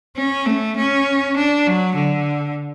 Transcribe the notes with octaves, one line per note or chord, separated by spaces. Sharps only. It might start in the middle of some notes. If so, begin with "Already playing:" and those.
C#4
A3
C#4
D4
F#3
D3